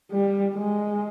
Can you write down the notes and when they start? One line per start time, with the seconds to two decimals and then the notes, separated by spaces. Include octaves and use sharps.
0.11 G3
0.55 G#3